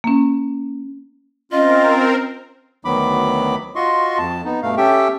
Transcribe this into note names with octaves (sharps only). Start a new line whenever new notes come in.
A#3 C#4
C4 C#4 F4 A#4 D#5
D2 D#3 F#3 B3 B5 D6
F4 F#4 D#5 C6 C#6
F2 A5
B3 D#4
G2 B2 A3 F5
C#4 G4 A4 E5 G5